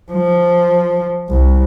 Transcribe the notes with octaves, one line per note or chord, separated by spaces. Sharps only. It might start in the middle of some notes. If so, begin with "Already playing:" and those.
F3
C2